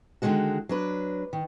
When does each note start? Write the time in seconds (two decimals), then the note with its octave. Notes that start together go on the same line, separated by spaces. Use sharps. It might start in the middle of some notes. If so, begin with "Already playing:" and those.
0.22 D3 D#3 F3 F#3 G#3 F#4
0.69 F#3 D4 B4
1.33 D#3